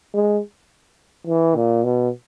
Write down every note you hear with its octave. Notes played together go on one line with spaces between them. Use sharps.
G#3
E3
A#2
B2